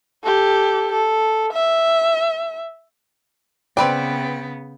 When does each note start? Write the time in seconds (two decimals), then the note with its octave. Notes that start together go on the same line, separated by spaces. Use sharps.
0.24 G4 A4
0.92 A4
1.53 E5
3.77 C#3 B3 C4 B4 D5 G5